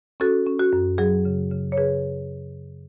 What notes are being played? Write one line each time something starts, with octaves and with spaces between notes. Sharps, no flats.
C#4 F#4 A4
C#4
F#4
F#2
F#3 G#4
C#3
C#3
C#5
C#3 G#4 B4